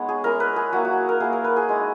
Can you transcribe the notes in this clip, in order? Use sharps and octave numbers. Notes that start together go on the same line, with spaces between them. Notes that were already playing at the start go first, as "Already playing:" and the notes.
Already playing: G#3 B3 D#4 C#5
G#4
G#3 C#4 E4 A#4
B4
G#4
F#3 A#3 E4 F#4
F#4
A#4
A#3 E4 G#4
A#4
B4
G#4
G#3 D#4